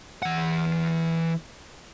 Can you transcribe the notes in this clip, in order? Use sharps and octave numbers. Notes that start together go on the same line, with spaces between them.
E3 F#5